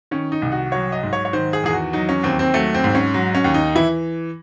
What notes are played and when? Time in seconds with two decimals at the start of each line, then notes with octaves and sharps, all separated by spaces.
0.11 D#3 C#4
0.32 D#4
0.42 C2
0.52 F#4
0.72 F#3 C#5
0.92 D#5
1.03 G#2
1.13 C#5
1.25 C#5
1.33 D#3 C5
1.53 G#4
1.64 E2 G#4
1.73 F#4
1.93 F#3 D#4
2.09 C#4
2.23 D#2 C4
2.39 C4
2.54 F#3 A3
2.74 C4
2.84 G#2
2.95 C#4
3.14 F#3
3.35 C#4
3.44 D#2
3.54 D#4
3.75 E3 E4